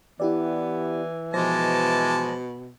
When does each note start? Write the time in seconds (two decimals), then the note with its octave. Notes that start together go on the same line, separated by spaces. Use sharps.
0.20 E3 B3 E4 G4 D5
1.34 B2 F3 G#3 C5 A5 D6 A#6